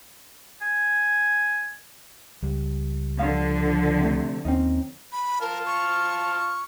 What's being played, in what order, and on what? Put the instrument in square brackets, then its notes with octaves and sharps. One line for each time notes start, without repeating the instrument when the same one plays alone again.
[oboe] G#5
[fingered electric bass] C#2 G3
[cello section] D3 F3 [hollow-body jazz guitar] F5
[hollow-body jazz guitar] C3 A3
[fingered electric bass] D#2 [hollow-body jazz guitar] C4 C#4 D#4
[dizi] B5
[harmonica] F4 A5 F6 [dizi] A#4
[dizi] C#6